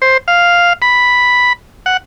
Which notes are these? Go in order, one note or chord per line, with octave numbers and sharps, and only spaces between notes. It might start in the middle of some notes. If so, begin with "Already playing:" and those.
C5
F5
B5
F#5